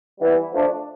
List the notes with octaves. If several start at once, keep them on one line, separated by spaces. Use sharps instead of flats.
E3 G3 B3 E4
F3 A3 D4